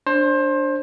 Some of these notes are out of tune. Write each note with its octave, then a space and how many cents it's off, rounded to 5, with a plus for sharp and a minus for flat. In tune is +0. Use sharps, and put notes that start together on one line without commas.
D4 +0 C5 +25